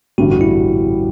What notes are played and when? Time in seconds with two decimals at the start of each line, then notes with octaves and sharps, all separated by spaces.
0.18 A1 G2 D3 G3 F#4
0.31 F#4
0.41 E4